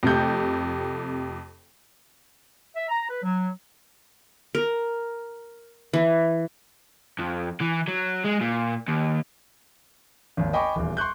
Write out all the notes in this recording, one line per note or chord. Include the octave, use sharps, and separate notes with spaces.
F2 C3 A3 G6
E5
A#5
B4
F#3
A#4
E3
F2
E3
F#3
G#3
A#2
D#2
G#1 D#2
D#5 G5 G#5 B5 C#6 D6
D#1 E2
C6 C#6 F#6 G6